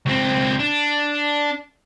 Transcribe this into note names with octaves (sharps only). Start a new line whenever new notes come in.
C#2 C4
D4